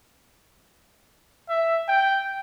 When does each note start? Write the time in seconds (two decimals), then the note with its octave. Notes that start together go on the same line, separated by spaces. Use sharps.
1.49 E5
1.88 G5